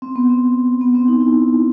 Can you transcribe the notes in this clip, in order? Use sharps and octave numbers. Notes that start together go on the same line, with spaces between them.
C4
B3
C4
B3
C4
D#4
E4